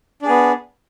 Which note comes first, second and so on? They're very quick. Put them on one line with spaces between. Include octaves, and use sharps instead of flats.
D4 G#4 B3